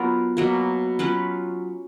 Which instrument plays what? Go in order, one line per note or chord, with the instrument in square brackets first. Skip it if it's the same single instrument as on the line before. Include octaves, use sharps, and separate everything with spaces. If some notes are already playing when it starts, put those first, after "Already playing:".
Already playing: [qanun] F#3 B3 F4 A#4
B2 F#3 A#3
F#3 C#4 F4 B4